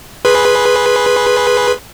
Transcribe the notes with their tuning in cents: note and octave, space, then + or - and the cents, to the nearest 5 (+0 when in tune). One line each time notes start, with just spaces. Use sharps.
G#4 +0 B4 -5 C6 +5